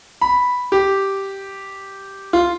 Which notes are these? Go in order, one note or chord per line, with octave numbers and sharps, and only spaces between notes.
B5
G4
F4